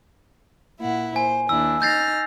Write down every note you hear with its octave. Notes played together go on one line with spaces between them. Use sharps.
A#2 E4 F#5
C5 G#5
D#2 D4 E4 E6
D#4 F6 G6 A6 A#6 C7